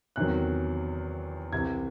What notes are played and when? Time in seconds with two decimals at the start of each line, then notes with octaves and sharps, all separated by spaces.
0.16 E2 C3 D#3 F#3 F#6
1.52 C2 C3 E3 G#6